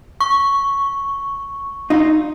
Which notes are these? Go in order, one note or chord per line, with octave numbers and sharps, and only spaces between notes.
C#6
D#4 F4